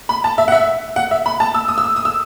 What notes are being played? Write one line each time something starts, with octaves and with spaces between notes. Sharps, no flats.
B5
A5
E5
F#5
E5
F#5
E5
B5
A5
E6
D#6
E6
D#6
D#6
E6